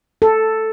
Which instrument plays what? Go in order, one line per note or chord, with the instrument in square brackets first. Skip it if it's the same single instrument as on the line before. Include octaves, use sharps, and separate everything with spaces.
[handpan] A4